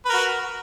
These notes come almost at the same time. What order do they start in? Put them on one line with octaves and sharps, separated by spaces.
B4 A#4 F#4